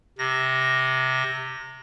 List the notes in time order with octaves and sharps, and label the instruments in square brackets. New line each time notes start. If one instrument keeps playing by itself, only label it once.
[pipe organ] C3 A#6